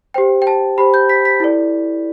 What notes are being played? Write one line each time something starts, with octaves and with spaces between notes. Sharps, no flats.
G4 C5 G5
G5
A5
G4 C5 B5
G6
B6
B6
E4 A4 D5